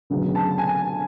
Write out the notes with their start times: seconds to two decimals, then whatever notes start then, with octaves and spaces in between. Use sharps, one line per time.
0.10 D2 C#3 F#3 B3
0.35 A5
0.58 G#5